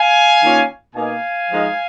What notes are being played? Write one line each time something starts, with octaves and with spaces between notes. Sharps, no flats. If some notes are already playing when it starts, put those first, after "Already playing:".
Already playing: F5 G#5
D#3 A#3 C#4 F4
B2 A#3 D#4 F5 G#5
F3 G#3 D#4